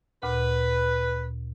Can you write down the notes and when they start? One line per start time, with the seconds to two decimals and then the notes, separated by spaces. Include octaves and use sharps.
0.23 D2 A#2 B4